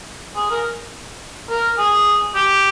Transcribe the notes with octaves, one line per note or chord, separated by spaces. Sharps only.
G#4
A#4
A#4
G#4
G4